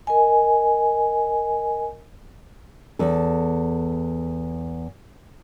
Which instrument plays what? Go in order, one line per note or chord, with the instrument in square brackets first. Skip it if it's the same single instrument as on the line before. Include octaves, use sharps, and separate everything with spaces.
[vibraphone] A#4 D#5 G#5
[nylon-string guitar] E2 A4